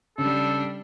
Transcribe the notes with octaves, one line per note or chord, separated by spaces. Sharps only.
C#3 G3 D4 A4